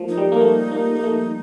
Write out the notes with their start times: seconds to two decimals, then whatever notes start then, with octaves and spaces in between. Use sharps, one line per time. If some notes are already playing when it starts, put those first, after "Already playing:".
Already playing: F3 A3 A#3
0.09 D#4
0.17 G3
0.32 A#3
0.41 A3
0.72 A#3
0.95 A#3
1.03 A3